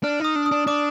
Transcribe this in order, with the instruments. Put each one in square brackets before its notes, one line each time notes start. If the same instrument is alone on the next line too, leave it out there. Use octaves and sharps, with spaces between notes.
[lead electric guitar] D4 [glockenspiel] F6
[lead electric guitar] D#4 [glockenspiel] D#6
[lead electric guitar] D4
[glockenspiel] D#6
[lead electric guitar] D4
[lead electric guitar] D4 [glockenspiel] D6